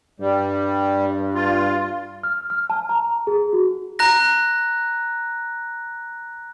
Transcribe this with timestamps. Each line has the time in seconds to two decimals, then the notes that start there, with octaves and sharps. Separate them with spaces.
0.20 G2 G3
1.34 F4
2.24 F6
2.50 F6
2.70 A5
2.89 A#5
3.27 G#4
3.53 F#4
3.99 A#5 F#6 A#6